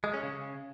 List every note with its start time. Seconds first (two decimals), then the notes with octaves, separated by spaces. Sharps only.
0.04 G#3
0.13 C#4
0.23 C#3